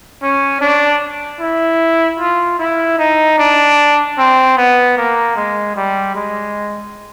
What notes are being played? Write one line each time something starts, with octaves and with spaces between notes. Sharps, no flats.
C#4
D4
E4
F4
E4
D#4
D4
C4
B3
A#3
G#3
G3
G#3